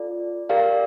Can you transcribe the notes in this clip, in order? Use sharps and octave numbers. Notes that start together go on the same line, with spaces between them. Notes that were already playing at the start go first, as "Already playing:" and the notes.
Already playing: F4 A4 D5
G4 A#4 D5 F5